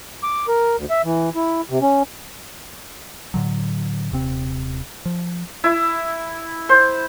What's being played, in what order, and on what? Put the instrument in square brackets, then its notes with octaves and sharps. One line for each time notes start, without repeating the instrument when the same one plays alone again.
[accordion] D6
A#4
D2
E5
E3
E4
C3
C#4
[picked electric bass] A2 D3 F#3
D#1 C3 C4
F3
[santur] E4
C5